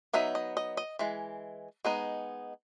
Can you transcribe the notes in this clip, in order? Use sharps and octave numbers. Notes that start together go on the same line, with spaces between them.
F#3 B3 D#4 E5
D#5
D#5
D#5
E3 G#3
G#3 B3 D#4